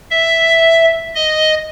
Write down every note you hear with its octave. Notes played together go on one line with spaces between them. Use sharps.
E5
D#5